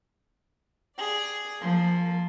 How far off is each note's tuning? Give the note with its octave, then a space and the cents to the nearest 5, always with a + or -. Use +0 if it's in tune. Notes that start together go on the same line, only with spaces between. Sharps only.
G#4 +0 D5 +0
F3 +0 A#3 +0 A#4 -35